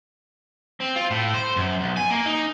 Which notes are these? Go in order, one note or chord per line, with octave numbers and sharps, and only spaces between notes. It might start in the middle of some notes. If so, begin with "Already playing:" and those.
C4
F4
A2
C5
F#2
B1
G#5
A#3
D#4